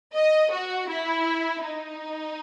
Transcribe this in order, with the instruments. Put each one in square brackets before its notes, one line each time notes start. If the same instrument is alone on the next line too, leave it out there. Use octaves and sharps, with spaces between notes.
[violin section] D#5
F#4
E4
D#4